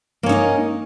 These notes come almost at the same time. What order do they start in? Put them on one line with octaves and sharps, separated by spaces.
A#3 C#4 D#4 D#5